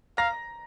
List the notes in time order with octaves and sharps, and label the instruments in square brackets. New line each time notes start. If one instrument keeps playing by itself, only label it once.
[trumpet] F5 [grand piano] A#5 A#6